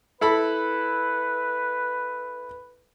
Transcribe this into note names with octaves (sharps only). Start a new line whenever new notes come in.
E4 A4 B4 B5